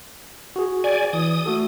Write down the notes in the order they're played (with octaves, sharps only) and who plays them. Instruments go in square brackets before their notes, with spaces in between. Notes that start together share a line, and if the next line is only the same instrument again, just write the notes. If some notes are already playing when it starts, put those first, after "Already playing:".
[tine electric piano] F#4 G#4
[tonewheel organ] D5 G#5
[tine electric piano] E3 [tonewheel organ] D#6
[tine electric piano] A3 F#4 A4